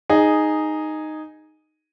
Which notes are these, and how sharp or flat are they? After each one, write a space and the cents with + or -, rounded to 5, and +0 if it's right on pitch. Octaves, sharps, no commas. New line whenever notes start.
D#4 -5 G#4 +0